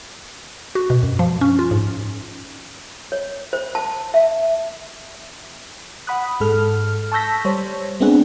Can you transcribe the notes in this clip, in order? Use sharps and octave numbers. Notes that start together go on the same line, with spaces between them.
F#4
B2
F#2
F3
C#4
F4
G#2
C#5
C5
A5
E5
F#5 B5 D#6 F#6
G#2 G#3 A4 F6
A5 C#6 E6 G6 A#6 B6
G3 C5 C#5
G#3 B3 C4 D4 G#4 F#5